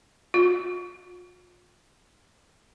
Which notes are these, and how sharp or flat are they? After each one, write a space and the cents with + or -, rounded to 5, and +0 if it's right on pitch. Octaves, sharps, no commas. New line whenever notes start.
F4 +40